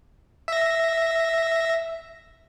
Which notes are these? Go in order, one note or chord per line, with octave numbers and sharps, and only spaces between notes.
E5 A#6